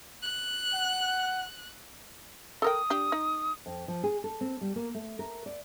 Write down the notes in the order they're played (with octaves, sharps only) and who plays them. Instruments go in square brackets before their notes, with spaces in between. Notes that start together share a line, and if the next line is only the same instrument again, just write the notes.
[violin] F#6
[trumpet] F#5
[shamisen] A4 A#4 G5 [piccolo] D#6
[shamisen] D4 G4
D#4
[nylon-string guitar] F2
F3
G#4
A4
C4
G3
A#3
A3
A#4
D5